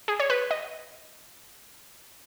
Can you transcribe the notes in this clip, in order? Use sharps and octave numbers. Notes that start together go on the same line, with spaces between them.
G#4
C#5
B4
D#5